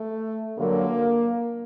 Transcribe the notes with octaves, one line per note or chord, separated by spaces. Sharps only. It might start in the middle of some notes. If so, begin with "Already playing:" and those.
Already playing: A3
G2 D3 F#3 A#3